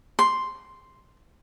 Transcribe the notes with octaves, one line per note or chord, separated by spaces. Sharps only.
C6